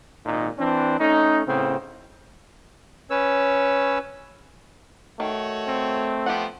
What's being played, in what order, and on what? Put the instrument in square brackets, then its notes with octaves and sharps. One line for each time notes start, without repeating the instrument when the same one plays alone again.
[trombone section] G#1 A#2 D#4
E3 C4 D4
A3 C#4 D#4
A2 C#3 B3 C4
[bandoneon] C#4 B4 C#5 E6
[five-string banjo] D#3 [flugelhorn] A3 [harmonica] F#4 C#5
[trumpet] C4
[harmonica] F3 B3 C5 [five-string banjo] G4 F#5